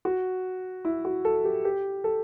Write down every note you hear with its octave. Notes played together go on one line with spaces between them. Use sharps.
F#4
E4
F#4
A4
G4
G4
A4